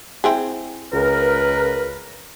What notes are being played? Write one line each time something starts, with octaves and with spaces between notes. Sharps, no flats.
C4 E4 G#4
C#2 A#4 B4